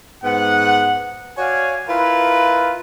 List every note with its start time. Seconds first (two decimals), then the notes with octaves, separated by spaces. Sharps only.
0.24 G#2 B3 F#5
1.38 F#4 C#5 D5 F5 G#5
1.88 E4 F4 A#4 B4